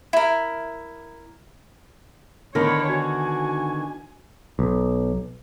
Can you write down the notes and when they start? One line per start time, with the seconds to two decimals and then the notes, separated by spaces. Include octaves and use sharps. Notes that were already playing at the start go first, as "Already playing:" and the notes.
0.13 E4 A#4
2.55 D3 D#3 B3 D4 A#4 C#5 B5
2.89 F#4 G#5
4.59 B1